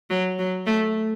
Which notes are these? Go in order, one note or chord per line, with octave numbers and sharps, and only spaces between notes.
F#3
F#3
A3